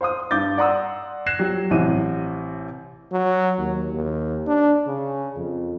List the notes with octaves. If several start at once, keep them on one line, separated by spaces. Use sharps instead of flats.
C5 F5 C6 D#6
G2 D6 G6 A6
D5 F#5 A#5 C6 D#6 E6
F#6 G#6 A#6 C7 E7
F3 F#3 G4
A1 C3 D#7
F#3
D#2
D#2
D4
C#3
F2